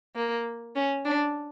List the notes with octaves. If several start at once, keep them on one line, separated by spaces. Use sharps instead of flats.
A#3
C#4
D4